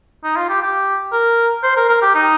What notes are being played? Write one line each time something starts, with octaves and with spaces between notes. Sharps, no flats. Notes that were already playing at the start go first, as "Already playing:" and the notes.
D#4
F4
G4
G4
A#4
C5
A#4
A#4
G4
D#4